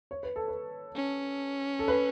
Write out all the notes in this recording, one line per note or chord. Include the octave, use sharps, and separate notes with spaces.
C#5
B4
A4
B4
C#4
A4
B4